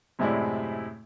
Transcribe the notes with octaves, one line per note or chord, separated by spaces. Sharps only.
F#2 A2 C3 G#3 E4 D5